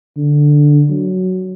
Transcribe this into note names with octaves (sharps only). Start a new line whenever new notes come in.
D3
F#3